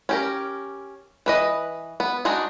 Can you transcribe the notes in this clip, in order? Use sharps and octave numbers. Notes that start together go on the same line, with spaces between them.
C#4 G4 A#4
E3 B4 D#5
B3
G#3 D4 D#4 F#4